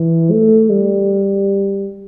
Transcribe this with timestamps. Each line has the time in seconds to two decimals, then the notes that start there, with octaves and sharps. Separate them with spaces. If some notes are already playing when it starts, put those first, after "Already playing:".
Already playing: E3
0.31 A3
0.70 G3